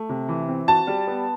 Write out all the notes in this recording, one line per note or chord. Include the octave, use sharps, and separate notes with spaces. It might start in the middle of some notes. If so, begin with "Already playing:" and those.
Already playing: A3
C3
E3
C4
F#4 A5
G3
B3